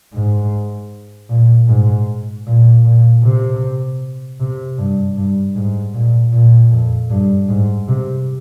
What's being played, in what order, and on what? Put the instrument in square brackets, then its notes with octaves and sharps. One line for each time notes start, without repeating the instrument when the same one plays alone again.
[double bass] G#2
A#2
G#2
A#2
A#2
C3
C3
G2
G2
G#2
A#2
A#2
F2
G2
G#2
C3